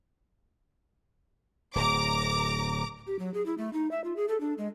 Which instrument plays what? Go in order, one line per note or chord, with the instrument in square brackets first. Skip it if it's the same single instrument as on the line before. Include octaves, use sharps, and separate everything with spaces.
[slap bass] D1 [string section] A#5 D6
[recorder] G4
F#3
G#4
E4
A3
D#4
E5
F4
G#4
A4
D4
G#3